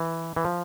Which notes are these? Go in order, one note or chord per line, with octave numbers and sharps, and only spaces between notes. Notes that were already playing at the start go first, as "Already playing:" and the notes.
Already playing: E3
E3
F3